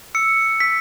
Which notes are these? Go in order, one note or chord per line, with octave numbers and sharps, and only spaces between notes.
E6 C#7
E6 B6